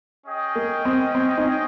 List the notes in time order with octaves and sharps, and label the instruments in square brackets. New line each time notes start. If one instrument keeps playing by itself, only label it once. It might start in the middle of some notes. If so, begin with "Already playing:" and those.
[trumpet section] C#4 G#4 D#5 G5
[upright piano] A#3
C4
C4
C4 D#4